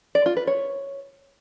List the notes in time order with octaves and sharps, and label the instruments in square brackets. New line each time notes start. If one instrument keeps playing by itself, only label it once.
[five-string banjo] D5
F4
B4
C#5